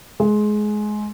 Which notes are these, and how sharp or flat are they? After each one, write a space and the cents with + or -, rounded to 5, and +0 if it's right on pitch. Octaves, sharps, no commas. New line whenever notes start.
G#3 +20